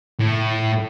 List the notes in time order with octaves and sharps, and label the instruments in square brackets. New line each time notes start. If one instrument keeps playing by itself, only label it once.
[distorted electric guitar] A2